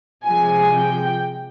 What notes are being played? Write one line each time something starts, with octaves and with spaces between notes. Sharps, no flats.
C3 F3 G#3 G#5
G5